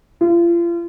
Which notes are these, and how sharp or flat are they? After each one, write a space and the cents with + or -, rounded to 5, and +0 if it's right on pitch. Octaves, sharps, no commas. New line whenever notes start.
F4 -35